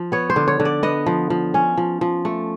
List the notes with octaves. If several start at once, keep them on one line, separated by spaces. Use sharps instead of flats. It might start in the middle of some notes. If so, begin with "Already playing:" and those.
Already playing: F3
B3 C#5
C5
D3
C#5
D3
D5
B3 D#5
F3
F3
C#4
F3
F3
A3